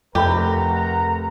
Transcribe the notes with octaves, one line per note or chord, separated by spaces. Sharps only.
F1 F2 A3 G4 A#4 F#5 A#5 B5